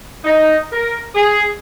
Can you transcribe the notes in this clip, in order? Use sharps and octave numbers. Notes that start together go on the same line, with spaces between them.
D#4
A#4
G#4